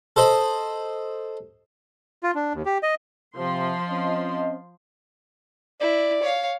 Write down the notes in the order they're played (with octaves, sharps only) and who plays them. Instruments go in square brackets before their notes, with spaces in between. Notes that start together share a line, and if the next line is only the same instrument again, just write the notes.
[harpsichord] A4 C5 D#5 B5
[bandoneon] F4
D4
D#2
G4
D#5
[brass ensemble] C3 [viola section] F3 C6
[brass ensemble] C4 C#4 D#5
[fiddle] E4 [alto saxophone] D5
[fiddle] C#5 F5